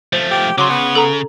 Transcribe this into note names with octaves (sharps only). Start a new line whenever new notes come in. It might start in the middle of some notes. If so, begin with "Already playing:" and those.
F3 A3 C5
G4
C#3 F#3 C6 D6
B3
A4 A#5